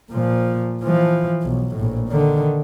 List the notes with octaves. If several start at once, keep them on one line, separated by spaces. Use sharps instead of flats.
A#2 F3
E3 F3
B1
A#1 A2
D3 D#3